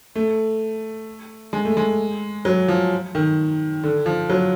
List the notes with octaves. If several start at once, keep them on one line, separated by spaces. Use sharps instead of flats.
A3
G#3
A3
G#3
F#3
F3
D#3
D3
F3
F#3